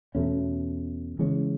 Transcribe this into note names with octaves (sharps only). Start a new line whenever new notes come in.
E2 B2 A3 C#4
C#3 E3 G#3 C#4